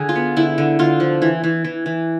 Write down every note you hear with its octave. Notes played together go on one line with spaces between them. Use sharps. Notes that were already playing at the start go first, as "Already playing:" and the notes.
Already playing: D3 G#4
F4
B3
D3 E4
D3
D3 F4
F3
E3
E3
E3
E3